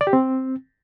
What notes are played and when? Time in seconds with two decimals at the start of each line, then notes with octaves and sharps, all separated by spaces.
0.01 D5
0.07 G4
0.13 C4